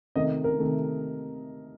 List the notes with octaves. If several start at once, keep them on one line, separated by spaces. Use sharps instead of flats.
C3 D#3 A3 D#5
A#4
C3 D#3 A3